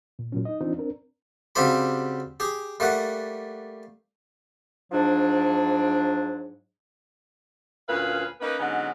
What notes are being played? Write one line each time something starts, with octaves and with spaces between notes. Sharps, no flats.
A#2
A#2 F#3 C#4
D#4 D#5
E3 C4 D4 D#4 F4
C4 D4 A#4
C#3 F#3 G3 C4 G4 B5
G4 G#4
G3 A3 A#3 F#5
G#2 F3 F#3 D4
D2 A#2 C#4 B4 F5
A#3 C#4 D#4 B4
D3 F#3 G#3 B3 C#4 D#4